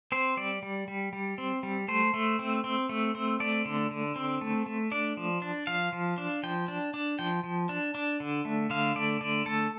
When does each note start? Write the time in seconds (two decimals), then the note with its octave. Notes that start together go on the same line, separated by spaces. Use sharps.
0.12 C4 C5
0.37 G3 D5
0.63 G3
0.88 G3
1.13 G3
1.38 C4
1.63 G3
1.88 A3 C5
2.14 A3
2.39 C4
2.64 C4
2.89 A3
3.15 C4
3.40 A3 D5
3.65 D3
3.91 D3
4.16 C4
4.41 A3
4.66 A3
4.92 D4 D5
5.17 F3
5.42 D4
5.67 F3 F5
5.93 F3
6.18 D4
6.43 F3 G5
6.68 D4
6.94 D4
7.19 F3 G5
7.44 F3
7.69 D4
7.95 D4
8.20 D3
8.45 A3
8.70 D3 F5
8.96 A3 D5
9.21 D3 D5
9.46 A3 A4